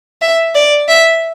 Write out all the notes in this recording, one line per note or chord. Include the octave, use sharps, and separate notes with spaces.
E5
D5
E5